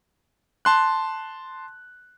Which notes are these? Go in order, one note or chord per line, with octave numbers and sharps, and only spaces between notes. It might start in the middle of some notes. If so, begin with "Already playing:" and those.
A5 C6 F#6